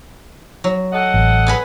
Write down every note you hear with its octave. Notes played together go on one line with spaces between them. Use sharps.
F#3
A4 D#5 F#5
A1
B3 G#4 B4